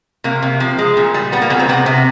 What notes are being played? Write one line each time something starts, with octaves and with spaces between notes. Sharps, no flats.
C3 A#3
C3
F3
G#3
A#2
G3
G3 B3
A#3
A#2 B3
C4
C3 B3
C3